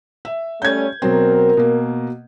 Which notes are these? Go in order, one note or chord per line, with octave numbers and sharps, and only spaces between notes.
E5
G3 A3 C#4 G6 G#6
B2 F#3 C4 A#4
B2 A#3